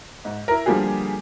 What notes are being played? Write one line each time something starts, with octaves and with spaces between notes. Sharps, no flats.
G#2
E4 A#4
D3 F3 G3 A#3 G4 G#4